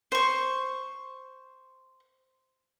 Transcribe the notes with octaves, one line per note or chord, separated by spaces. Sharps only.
C5 C#6